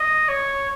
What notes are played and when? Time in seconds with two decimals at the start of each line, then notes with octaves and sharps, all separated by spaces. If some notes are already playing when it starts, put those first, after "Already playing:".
Already playing: D#5
0.28 C#5